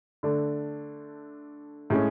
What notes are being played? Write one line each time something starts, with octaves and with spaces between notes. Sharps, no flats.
D3 A3 D4
A2 G#3 C#4